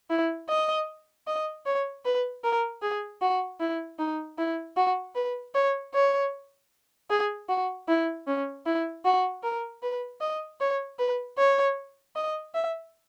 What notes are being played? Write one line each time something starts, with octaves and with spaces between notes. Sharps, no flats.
E4
D#5
D#5
C#5
B4
A#4
G#4
F#4
E4
D#4
E4
F#4
B4
C#5
C#5
G#4
F#4
E4
C#4
E4
F#4
A#4
B4
D#5
C#5
B4
C#5
D#5
E5